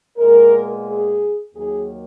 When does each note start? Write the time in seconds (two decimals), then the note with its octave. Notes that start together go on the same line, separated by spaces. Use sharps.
0.17 A#2 G#3 B3 A#4
0.86 G#4
1.55 D#2 D#3 F#3 A#3 G#4